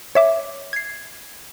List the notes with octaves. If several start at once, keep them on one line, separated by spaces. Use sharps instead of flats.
C#5 E5 D6
G#6 C7